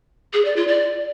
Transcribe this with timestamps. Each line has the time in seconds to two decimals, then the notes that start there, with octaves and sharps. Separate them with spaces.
0.33 G#4
0.45 D5
0.56 F4
0.68 D5